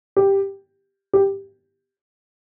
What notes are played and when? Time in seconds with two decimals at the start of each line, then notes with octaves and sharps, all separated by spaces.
0.17 G4
1.13 G4